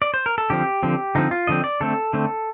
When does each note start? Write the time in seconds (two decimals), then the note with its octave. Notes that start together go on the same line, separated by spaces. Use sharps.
0.02 D5
0.14 C5
0.26 A#4
0.38 A4
0.50 D3 F3 C4 G4
0.83 D3 F3 C4
1.15 D3 F3 C4 D#4
1.31 F4
1.47 D3 F3 C4 D#5
1.64 D5
1.81 D3 A3 C4 A4
2.13 D3 A3 C4